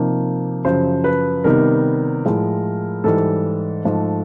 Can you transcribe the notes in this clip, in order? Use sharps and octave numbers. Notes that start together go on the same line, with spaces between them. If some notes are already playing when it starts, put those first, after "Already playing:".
Already playing: C3 F3 A#3 D#4
F#2 C#3 F3 C5
B4
C3 D#3 G3 B3 D#4 A#4
A2 F3 G#3
G#2 E3 G3 A4
G#2 F3 A3